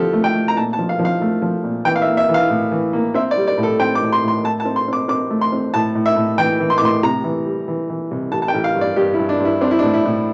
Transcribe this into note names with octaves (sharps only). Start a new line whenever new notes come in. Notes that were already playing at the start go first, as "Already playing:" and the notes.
Already playing: F2 D3 F3 G4 A4
A3
G5
A3
A#5
A#2 A5
A5
F3
F5
F3
F5
A3
F3
A#2
E3 G5
F5
E5
A#3
E5
E3
F5
A2
E3
A#3
C4 E5
D5
G3
D5
A2
A4
C4 G5
D6
A2
C6
A2 C6
A3 A5
A5
C4
C6
C4 D6
C4 D6
A3
C6
C4
A2 A5
A2
E5
A2
E3 G5
E3
C6
D6
A2 C6
C3 A#5
E3
G3
E3
E3
C2
A1 A5
A5
G5
A1
F5
G2
D5
G2 G4
E4
G2
D4
G2
E4
C4 D4
E4
D4
A2
E4
A2